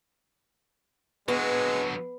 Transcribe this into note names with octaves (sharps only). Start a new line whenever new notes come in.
D3 F#3 G#3 B3 B4